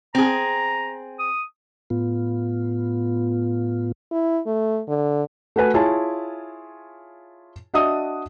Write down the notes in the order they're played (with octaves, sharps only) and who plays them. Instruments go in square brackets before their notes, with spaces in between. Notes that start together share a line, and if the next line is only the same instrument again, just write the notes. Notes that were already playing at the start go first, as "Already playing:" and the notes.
[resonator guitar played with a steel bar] C4 G#4 [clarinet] A#5
[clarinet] D#6
[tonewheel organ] A2 B3 F4
[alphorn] E4
A3
D3
[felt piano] A3 F#4 B4 G#5
E4 F4 G#4 C#5 G#5 A5
D4 F#4 D#5 E5 A5 D#6